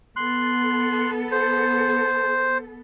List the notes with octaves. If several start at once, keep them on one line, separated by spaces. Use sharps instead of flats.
B3 A4 C6 F#6
C5